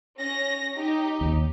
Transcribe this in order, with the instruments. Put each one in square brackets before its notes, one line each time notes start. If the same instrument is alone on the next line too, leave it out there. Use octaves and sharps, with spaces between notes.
[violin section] C#4 A#6
D#4 G4
[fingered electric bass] D#2